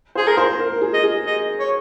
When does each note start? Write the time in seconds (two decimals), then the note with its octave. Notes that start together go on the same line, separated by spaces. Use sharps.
0.15 G#4 C5
0.27 A#4
0.37 C5
0.59 A#4
0.82 G#4
0.93 D#5
1.04 G#4
1.26 D#5
1.59 C#5